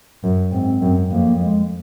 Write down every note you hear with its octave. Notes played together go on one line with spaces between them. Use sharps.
F#2
G#2 C4
F#2
F2 A#3
G#3